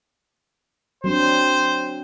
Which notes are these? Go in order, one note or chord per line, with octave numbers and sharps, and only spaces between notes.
F#3 C4 D4 C5